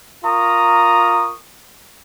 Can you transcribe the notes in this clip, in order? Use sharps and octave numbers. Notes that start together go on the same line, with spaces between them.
F4 A#4 A#5 C#6 D#6